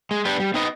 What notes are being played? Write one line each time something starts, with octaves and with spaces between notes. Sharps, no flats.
G#3
B3 D4 G4 B4
G3
C4 D#4 B4 D#5